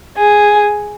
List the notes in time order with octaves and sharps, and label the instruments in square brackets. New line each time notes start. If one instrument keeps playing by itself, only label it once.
[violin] G#4